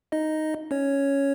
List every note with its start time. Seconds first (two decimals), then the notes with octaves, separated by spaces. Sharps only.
0.12 D#4 D#5
0.71 C#4 C#5